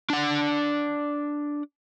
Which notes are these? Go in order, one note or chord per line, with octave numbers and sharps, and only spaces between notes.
D4 F#5